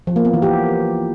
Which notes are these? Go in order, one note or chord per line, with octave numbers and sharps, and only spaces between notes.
F3
A#3
B3
E3
G4